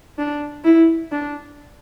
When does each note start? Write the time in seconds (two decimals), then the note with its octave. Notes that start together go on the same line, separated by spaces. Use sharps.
0.18 D4
0.64 E4
1.12 D4